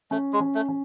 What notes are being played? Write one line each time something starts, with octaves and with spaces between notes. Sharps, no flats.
A3 C#4
G#3
C#4
A3
C#4